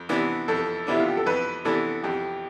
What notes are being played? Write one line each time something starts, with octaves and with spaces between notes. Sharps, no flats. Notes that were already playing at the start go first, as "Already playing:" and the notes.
Already playing: F2
C3 E3 B3 D4
F2 A4
C3 E3 B3 D4 E4
F4
G4
A4
F2 B4
C3 E3 B3 D4 A4
F2 G4